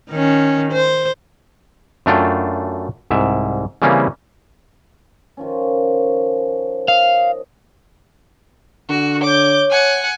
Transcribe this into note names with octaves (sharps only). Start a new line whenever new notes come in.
D#3 C#4
C5
F#2 A3 D4 F4 G5
C2 G#2 E5
C#3 E3 G3 A#3 C4 C#4
D#3 F3 C#4
D#5 F5
D3 F#4
C#5 D6 G6
F#5 G#5